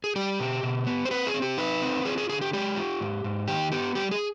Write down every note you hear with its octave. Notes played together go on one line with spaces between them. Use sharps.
G#4
G3 G4
B2
B2
B3
C5
C4 B4
G#4
C4
G4
D#4 B4
C4
F4 G#4
G#4
D3 G#4
G4
G#3 G4
F4
G#2
G#2
D#3 G4
B3 G4
G3 G4
G#4